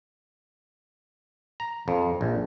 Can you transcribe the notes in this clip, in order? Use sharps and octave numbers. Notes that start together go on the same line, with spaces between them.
A#5
F2
A#1